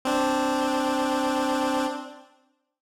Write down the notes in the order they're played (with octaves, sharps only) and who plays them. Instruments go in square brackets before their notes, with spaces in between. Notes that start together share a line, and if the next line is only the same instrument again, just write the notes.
[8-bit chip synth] C4 D4